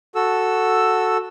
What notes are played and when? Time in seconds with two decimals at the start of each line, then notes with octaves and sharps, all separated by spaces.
0.15 F#4 A4 E6